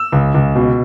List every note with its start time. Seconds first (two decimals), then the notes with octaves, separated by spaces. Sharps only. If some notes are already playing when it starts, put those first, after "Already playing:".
Already playing: E6
0.12 C#2
0.34 C#2
0.55 B2